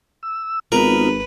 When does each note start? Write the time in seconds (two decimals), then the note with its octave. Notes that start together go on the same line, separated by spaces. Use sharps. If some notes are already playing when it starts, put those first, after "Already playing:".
0.23 E6
0.72 G#1 B3 D#4 F4 A#4 B4